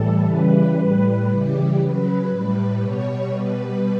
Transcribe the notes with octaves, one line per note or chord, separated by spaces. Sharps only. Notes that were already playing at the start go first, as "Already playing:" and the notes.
Already playing: A2 E3 G3 A4
C#3 E3 G3 B4
A2 G3
C#3 E3 G3 G4
C#3 F#3 B4
A2 G3
B2 G3 C#5
B2 G3 B4